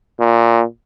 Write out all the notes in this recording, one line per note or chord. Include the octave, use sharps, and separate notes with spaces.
A#2